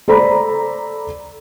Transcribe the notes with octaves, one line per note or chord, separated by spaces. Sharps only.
A4 C5 D5 A#5 B5